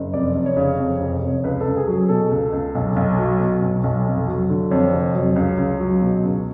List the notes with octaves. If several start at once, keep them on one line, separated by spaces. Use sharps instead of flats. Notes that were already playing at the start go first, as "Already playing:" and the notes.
Already playing: F#1
F1 D5
F1
C#5
C#3
F2
F1
F1
C#2 B4
A4
C#2
G#4
F#3
G#4
B2 A4
C#2
C#2
B1
B1
F#3
B2
B1
B1
F1
F#3
D3
F2 C#5
F1
F#3
C#2
C#2
F#3
B2
C#2